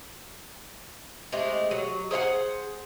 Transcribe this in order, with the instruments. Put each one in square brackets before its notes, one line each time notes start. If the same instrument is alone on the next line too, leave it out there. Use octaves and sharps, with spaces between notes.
[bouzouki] G#3 A3 C4 G4
F#3
G#4 C5 F5 F#5